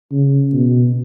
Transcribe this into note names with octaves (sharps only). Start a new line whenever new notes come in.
C#3
B2